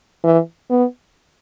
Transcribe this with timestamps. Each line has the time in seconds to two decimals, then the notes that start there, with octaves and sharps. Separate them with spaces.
0.24 E3
0.70 B3